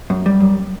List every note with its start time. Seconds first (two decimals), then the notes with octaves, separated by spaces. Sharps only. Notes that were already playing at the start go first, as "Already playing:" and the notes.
0.10 F#2
0.26 G3
0.40 F#2